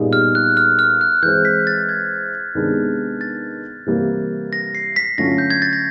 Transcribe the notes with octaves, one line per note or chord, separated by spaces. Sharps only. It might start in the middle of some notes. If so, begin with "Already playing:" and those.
Already playing: A#2 G3 B3 D#4 G#4
F6
F#6
F6
F6
F#6
E3 G#3 C4 G6
B6
A6
G#6
C3 D#3 G#3 B3 D4
A6
C3 E3 G3 A#3
A#6
C7
B6
D3 F#3 A3 C#4 F4 A#6
G6
G#6
A6
A#6